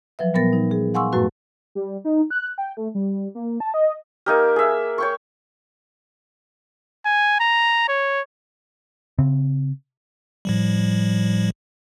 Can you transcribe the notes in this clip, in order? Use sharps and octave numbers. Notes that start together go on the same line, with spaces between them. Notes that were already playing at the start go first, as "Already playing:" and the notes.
F3 F#3 B4 E5
A#2 G3 B3 A#4 A6 A#6
D#4
G#4
F5 F#5 G#5 C6 C#6 E6
F#2 A2 A3 F#4 B4
G3
D#4
F#6
G5
A3
G3
A#3
A5
D#5
A#3 D#4 G4 A#4 F6
G#4 E5
C#5 G5 C#6
G#5
A#5
C#5
C#3 C4
A2 F3 G3